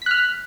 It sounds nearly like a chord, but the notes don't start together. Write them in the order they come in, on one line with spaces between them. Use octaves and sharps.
B6 F#6 F6